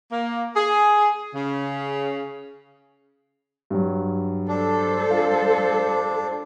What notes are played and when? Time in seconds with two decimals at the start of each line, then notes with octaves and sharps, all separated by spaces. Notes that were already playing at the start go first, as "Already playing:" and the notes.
0.10 A#3
0.54 G#4
1.34 C#3
3.70 G2 F#3
4.49 G3 D4 A4 C5
5.10 F4